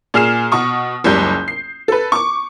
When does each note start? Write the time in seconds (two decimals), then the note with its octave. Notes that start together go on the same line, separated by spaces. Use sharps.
0.14 A#2 G#4 F6 C7 E7
0.52 B2 C#6 D#6
1.04 F#1 C#2 G3 G6
1.48 C7
1.88 A4 B4
2.12 C#6 D6